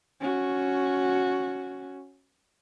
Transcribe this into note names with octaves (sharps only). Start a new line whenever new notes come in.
C#4 F#4